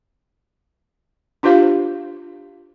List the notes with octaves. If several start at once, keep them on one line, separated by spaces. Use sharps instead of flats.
D4 F4 G4 C5 F5